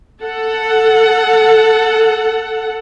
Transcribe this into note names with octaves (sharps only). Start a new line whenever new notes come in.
A4 F#5